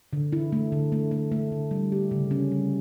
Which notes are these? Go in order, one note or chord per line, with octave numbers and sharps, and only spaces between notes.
D3
E4
A3
D3
A3
A3
A3
D3
G3
G4
C#3
C#4
G3